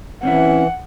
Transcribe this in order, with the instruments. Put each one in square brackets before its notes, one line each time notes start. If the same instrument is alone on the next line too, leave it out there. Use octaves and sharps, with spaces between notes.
[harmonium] E3 [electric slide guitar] C4 C#4 E4 [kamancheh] F#5